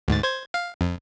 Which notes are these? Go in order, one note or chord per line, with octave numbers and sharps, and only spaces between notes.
D2 G#2 A6
C5 G#6
F5
F2